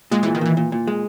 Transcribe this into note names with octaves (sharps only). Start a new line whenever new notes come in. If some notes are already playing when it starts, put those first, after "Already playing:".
A#2 G#3
A#2 E3
D#3
A#2 E3
A#2
A#2
G#3